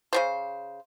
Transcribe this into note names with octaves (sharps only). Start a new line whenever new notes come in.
C#3 F#3 C5